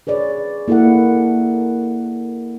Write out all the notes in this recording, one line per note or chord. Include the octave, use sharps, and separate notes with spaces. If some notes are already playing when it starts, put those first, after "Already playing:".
G#4 B4 C#5 D5
A#3 E4 A4 A#4 F#5